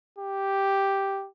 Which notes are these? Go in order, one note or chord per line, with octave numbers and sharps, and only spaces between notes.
G4